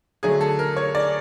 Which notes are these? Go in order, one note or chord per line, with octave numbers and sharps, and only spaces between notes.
D3 F#3 A3 G#4
A4
A#4
C#5
D5